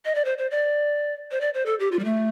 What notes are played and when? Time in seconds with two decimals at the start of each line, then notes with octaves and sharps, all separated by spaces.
0.05 D#5
0.15 D5
0.25 C5
0.38 C5
0.51 D5
1.31 C5
1.41 D5
1.54 C5
1.66 A4
1.80 G4
1.92 F4
1.99 G3
2.05 A3